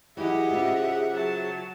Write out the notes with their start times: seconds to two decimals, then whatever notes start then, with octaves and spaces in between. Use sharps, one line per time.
0.17 E3 F#3 E4 G4 G#4 D#5 E5 F#5
0.51 C#3 C4 F4
1.14 F#3 A5